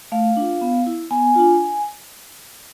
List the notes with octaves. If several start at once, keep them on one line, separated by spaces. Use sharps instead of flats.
A3 F5
D4 F4
B3
E4
B3 G#5
D4 F4